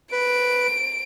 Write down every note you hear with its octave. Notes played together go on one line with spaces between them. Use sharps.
B4 D7